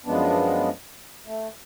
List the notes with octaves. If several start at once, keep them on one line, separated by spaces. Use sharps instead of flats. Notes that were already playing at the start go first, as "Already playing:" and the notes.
F#2 F3 G#3 B3 D4
A3